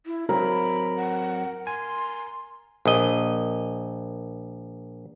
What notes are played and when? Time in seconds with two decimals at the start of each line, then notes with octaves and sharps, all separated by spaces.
0.06 E4
0.29 F#3 C4 A#4 B5
0.97 F#5
1.67 G#5 C6
2.85 A#1 D#5